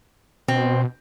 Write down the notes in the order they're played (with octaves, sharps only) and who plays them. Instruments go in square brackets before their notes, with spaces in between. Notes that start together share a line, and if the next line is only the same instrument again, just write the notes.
[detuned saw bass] B2 [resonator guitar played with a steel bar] C4